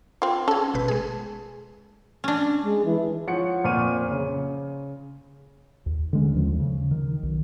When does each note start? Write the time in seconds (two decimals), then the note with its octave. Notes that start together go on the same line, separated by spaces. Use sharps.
0.22 C4 F4
0.48 C#4 G#4 A4
0.74 G#1 B2 B4
0.88 G#3 G#4
2.24 C#4 D4
2.62 G#3
2.85 E3
3.27 F3 C#5 F#5 C#7
3.64 F2 A#2 C5 C#6 F6 D#7
4.11 C#3
5.86 D#2
6.13 D3 G#3 C#4
6.35 D#2 F3 G#3
6.59 C#3
6.91 D#3
7.23 B1